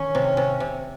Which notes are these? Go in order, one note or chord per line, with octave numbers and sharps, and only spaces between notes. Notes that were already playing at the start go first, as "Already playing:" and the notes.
Already playing: D#3 C#4
C3
C3
C3